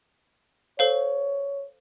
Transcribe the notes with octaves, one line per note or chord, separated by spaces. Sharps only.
A4 C5 C#5 F5